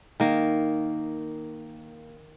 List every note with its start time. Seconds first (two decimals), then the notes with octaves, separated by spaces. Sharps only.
0.20 D#3 A#3